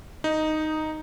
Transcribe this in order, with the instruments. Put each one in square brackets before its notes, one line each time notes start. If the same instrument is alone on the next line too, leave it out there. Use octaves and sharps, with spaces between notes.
[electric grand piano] D#4